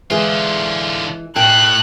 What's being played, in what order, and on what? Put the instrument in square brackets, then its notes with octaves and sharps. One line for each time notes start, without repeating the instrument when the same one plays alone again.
[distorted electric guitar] D3 F4 [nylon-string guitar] E3 G#3 G#4
[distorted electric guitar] A2 [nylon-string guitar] G5 [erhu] F#6